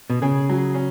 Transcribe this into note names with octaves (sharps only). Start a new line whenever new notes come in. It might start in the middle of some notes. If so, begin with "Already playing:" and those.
B2
C#3 G#4
F#3
C#4